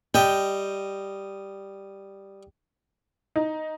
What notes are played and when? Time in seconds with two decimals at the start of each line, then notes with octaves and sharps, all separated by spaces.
0.14 G3 D#5 G5
3.36 D#4